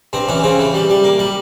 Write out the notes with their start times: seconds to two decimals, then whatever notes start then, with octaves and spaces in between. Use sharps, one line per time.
0.13 G2 C4
0.28 E3 C#4
0.44 C#3 C4
0.59 E3
0.74 G3
0.89 G3
1.04 A#3
1.19 G3